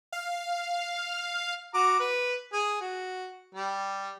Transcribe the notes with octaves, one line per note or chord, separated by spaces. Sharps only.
F5
F#4 A#5 D6
B4
G#4
F#4
G3